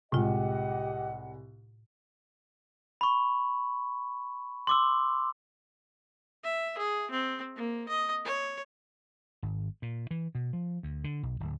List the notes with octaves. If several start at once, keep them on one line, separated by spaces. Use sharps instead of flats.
C2 A2 G#3 F4 G4 D#5 F#5
B5 C#6
C6 D6 E6
E5
G#4
C4
A#3
D#5
C#5
G#1
A#2
E3
B2
F3
D2
D3
B1
D1